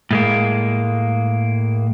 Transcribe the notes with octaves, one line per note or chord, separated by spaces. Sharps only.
A2 G#3 A#3